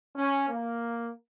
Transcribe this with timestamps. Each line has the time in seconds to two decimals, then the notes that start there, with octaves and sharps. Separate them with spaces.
0.16 C#4
0.49 A#3